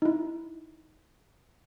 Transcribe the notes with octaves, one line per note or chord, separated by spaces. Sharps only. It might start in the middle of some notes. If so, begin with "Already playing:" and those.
D#4 E4